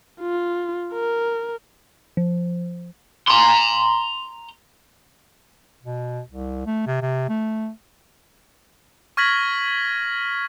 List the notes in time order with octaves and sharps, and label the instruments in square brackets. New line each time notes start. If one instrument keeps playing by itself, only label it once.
[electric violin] F4
A#4
[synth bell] F3
[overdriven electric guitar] A#5 C6
[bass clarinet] B2
C2
A3
C3
C3
A3
[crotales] C#6 F6 G#6 A#6 B6 F#7